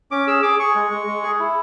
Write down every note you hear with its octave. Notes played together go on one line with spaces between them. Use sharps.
C#4 D6
G#4 E6
G#4 D6
G#4 C#6
G#3
G#3
G#3
G#4
E4